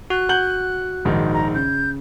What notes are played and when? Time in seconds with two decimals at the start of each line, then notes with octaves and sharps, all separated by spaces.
0.10 F#4 F#6
0.29 F#5 G6 F#7
1.05 A#1 G#2 D#3
1.33 A#5
1.54 C#3 G6